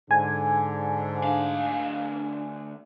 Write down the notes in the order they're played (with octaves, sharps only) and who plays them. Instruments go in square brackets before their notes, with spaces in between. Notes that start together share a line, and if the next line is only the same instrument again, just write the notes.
[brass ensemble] G#2 D3 [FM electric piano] G#5
[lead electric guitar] D2 F5 [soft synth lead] D4